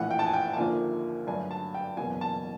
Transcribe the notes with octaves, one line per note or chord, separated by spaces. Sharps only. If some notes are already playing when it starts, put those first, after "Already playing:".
Already playing: A#1 A2 E3 F#5
G5
A5
G#5
G5
A5
D#2 D3 F3 A#3 G#5
G2 D3 F#3 A3 G#5
A5
G5
F#1 E2 B2 F#3 G#5
A5